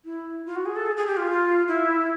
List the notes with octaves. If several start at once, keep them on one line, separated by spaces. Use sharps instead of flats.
E4
F4
F#4
G#4
A4
G#4
G#4
G4
F4
E4